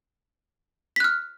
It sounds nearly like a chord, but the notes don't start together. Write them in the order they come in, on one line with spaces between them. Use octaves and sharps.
B6 F#6 F6